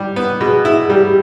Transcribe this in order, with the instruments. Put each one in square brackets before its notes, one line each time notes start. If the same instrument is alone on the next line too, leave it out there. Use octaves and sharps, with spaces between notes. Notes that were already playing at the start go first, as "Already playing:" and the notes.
Already playing: [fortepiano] G3 [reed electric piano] E4
[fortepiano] B3
[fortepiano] B2 [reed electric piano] G#4
[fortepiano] E4
[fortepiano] G3 [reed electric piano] G4